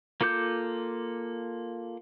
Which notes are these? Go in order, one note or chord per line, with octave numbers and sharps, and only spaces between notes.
A#3 F4 A4 D6 G6